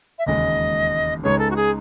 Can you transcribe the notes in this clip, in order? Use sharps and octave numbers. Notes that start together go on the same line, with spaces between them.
E5
E1 D#2 C#3 G#3 D#5
C#2 C#3 G#3 D#4 C#5
A4
F#4
G#4